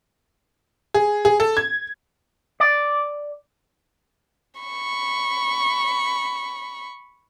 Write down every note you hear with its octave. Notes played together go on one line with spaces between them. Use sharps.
G#4
G#4
A4
G#6
D5
B5 C#6